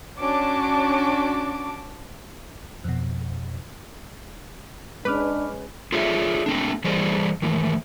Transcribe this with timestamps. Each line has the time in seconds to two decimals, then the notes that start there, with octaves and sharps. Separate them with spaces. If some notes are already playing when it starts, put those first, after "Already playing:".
0.19 C#4 D4 F#4 A5 D6
2.84 F2 B2
5.05 G#3 C#4 D4 B4 B5 D6 F6
5.92 F4 G#4 A4 C#5 D5 E5
6.46 A3 C4 D4
6.84 E3 G3 G#4 C5 D5 D#5
7.42 D#3 E3 A3